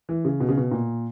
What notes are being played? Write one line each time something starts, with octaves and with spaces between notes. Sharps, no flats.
E3
C#3
B2
C#3
B2
A#2